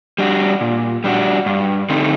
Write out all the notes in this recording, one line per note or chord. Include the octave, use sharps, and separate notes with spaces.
G3 D4 F#4
A#2
G3 D4 F#4
G2
D3 A3 C4 D#4